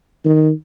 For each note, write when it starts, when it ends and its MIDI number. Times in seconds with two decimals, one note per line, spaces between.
0.25 0.51 51